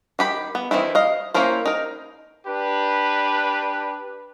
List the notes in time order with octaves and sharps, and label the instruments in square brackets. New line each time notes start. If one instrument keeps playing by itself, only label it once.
[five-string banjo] D#3 G4 B5
B3
D#3 E3 C4 E4
D#5 F5
A#3 C#4 E4 A#4 C5
D#4 A#4
[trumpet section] D4 G4 B4